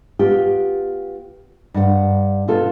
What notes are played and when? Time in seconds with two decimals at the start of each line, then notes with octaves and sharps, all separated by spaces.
0.19 B3 F4 G4
1.74 G2 F#5
2.48 B2 B3 F4 A4